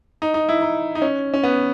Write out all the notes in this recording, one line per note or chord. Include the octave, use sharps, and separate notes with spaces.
D#4
D#4
E4
D#4
D#4
C#4
C#4
B3